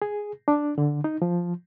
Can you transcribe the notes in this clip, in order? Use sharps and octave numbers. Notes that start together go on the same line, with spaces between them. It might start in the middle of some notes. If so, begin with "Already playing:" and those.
G#4
D4
D3
D#4
F3